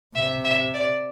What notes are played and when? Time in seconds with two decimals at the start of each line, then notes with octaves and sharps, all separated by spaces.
0.15 C3 E5
0.44 E5
0.74 D5